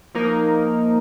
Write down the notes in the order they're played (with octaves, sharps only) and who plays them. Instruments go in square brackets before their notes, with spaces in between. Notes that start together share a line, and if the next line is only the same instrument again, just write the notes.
[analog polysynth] F3 A#3 D#4 A#4